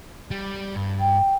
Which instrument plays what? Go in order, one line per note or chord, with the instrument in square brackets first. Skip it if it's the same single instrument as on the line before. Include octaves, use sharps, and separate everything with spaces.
[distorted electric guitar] G3
G2
[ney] G5